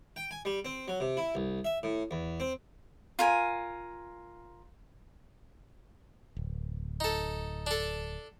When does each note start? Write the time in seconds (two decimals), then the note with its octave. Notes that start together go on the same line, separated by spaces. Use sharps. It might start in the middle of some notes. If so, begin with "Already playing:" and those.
0.16 G5
0.31 G#5
0.45 G3
0.65 C4
0.88 F#3
1.00 C3
1.17 E4
1.35 C2
1.65 E5
1.83 A2
2.11 E2
2.40 C4
3.19 F4 A#4 G#5
6.37 D1
7.00 D#4 A4
7.67 D4 A4